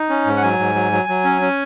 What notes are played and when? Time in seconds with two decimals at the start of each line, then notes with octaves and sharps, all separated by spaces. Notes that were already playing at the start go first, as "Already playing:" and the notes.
Already playing: D#4
0.09 C#4
0.26 G#2
0.37 F#5
0.43 F#3 G#5
0.59 G#2
0.75 F#3
0.92 F#3
1.09 F#3
1.25 C#4
1.42 C#4